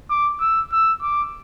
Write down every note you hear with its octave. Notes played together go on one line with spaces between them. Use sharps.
D6
E6
E6
D6